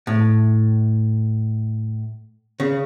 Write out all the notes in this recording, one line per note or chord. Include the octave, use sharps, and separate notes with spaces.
A2
C#3